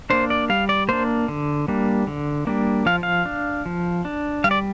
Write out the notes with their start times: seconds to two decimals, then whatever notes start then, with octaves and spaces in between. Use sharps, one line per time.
0.10 A#3 D4 C5
0.30 D5
0.49 G3 F5
0.69 D5
0.89 A#3 D4 C5
1.28 D3
1.68 G3 A#3 D4
2.07 D3
2.47 G3 A#3 D4
2.86 F3 F5
3.03 F5
3.26 D4
3.66 F3
4.05 D4
4.44 G3 F5
4.51 D5